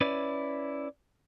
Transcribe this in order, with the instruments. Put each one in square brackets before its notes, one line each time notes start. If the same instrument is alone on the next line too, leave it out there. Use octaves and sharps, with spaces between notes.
[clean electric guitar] C#4 E4 B4 C#5 D5